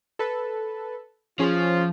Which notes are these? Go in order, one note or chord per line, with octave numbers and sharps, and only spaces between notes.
A4 B4
F3 C#4 F4 G#4 C5